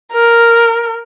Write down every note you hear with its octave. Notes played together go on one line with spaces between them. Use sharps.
A#4